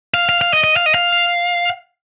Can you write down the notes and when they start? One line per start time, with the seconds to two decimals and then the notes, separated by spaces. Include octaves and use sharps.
0.14 F5
0.29 F5
0.41 F5
0.53 D#5
0.64 D#5
0.76 F5
0.86 D#5
0.94 F5